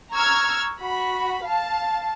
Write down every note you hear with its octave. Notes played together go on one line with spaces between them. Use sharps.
A#5 C#6 E6 F6 G#6
F#4 B5
F5 A5